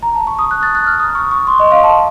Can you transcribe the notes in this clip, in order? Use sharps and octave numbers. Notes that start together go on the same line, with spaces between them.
A#5
A5
C#6
D#6
F#6
A6
F#6
F6
D#6
C#6
C#6
C6
D#5
F5
A5